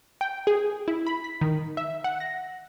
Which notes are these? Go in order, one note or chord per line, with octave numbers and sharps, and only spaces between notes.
G5
G#4
E4
B5
B6
D#3
E5
F#5
A#6